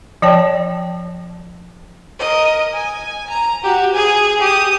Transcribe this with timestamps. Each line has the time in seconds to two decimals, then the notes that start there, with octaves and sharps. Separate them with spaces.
0.22 F3 C#5 D5 G5 A5
2.19 A#4 D#5
2.74 G#5
3.30 A#5
3.63 F#4 G4
3.94 G#4 G#5
4.40 G4 D#6